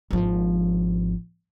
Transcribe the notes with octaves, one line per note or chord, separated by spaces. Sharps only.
G#1 F3